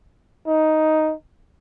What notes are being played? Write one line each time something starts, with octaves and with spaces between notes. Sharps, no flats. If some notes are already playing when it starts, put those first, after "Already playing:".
D#4